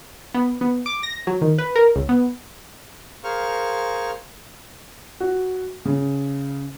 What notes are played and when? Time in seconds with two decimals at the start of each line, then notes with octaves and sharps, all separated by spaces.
0.34 B3
0.61 B3
0.86 D6
1.03 A#6
1.27 F#3
1.41 D#3
1.58 B4
1.75 A#4
1.96 C#2
2.09 B3
3.24 G#4 A#4 C5 F5 C#6 F6
5.20 F#4
5.85 C#3